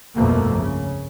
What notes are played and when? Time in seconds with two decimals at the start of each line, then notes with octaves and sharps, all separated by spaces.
0.15 G1 C2 F2 B2 A3 A#3
0.58 C#3